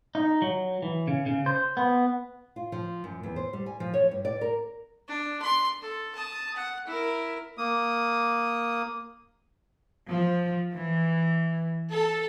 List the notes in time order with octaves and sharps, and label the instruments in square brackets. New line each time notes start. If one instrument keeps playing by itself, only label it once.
[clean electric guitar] D#4
F#3
E3
C#3
C#3
C5
B3
[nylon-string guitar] F4
F3
F#2
E2
C5
G3
G#5
F3
C#5
G2
D5
A#4
[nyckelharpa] D4
C6
A4
A5 D#6
F#5
E4 A#4
[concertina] A#3 D#6
[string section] F3
E3
A4